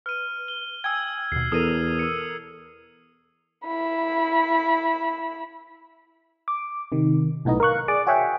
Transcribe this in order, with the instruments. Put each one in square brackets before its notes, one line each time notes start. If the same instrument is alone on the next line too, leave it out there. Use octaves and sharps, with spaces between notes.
[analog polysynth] B4 [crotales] F6 D#7
[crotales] G7
[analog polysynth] G5 G#5 D#6 [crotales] E6 G#6
[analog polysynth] D#2 B2 [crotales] C7
[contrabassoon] E2 [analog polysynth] A4 A#4 [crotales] D#6 E6 D#7
[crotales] E6 C#7
[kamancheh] E4 B5
[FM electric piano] D6
C3 D#3
B1 A2 B3 D#4 D#5
A#4 F5 C#6 F#6
G#4 D5 D6
F#4 G#4 C#5 E5 F#5 G5